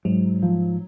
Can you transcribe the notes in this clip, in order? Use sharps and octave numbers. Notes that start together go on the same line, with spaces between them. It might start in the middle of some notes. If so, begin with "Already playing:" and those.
G#2 F#3
F3